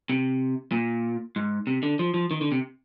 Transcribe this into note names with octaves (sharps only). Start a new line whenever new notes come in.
C3
A#2
G#2
C3
D3
F3
F3
D#3
D3
C3